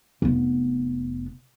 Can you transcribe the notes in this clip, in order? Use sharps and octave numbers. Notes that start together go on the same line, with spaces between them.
F1 B3